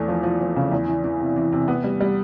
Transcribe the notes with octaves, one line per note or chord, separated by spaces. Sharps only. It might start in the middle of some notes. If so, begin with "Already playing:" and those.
Already playing: E2 A3
F3
F3
F3
C#3
E2
E3
E3
C3
E3
C3
B3
G3
G3